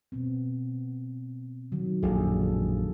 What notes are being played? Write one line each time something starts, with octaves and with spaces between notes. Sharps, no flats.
B2 B3 C4
D#3 F#3
A#1 F#2 G#4 A4